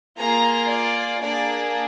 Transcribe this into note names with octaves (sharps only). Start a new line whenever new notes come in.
A#3 F4 G#4 A#5
D5
A#3 D4 G#4 D5